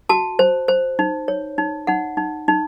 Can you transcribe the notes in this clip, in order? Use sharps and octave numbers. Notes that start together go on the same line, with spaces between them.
F#4 A5
C5
C5
D#4
C#5
D#4
D#4 F#5
D#4
D#4